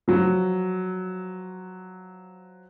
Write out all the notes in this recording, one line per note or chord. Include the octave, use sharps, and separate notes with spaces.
F3 F#3